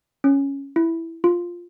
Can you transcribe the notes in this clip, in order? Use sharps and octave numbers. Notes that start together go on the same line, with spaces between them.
C#4
E4
F4